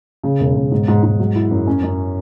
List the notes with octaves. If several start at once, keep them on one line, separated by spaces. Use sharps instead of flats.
C#3
E1
E1
G#2
G#2
G#2
F#3
E4
F#2
C#4
F#2